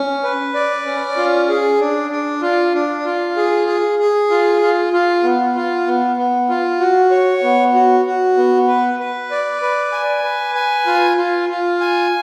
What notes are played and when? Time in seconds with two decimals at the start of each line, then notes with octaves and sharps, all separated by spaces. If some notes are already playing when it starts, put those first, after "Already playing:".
Already playing: C#4
0.23 B4
0.54 D5
0.86 C#4
1.17 F4
1.49 G#4
1.80 D4
2.10 D4
2.42 F4
2.74 D4
3.05 F4
3.37 G#4
3.67 G#4
3.99 G#4
4.31 F4
4.62 F4
4.93 F4
5.23 B3
5.55 F4
5.87 B3
6.17 B3
6.49 F4
6.80 F#4
7.11 C#5
7.43 B3
7.74 F#4
8.05 F#4
8.37 B3
8.68 B4
9.00 B4
9.31 D5
9.62 B4
9.92 G#5
10.24 B4
10.55 G#5
10.87 F4
11.17 F4
11.49 F4
11.80 G#5